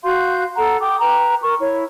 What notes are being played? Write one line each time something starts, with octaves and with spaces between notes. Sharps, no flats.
F#4 F5 C6 G6
A4 F#5 A#5
G5 D6 D#6
B4 G5 A#5
A#4 C#6
E4 C#5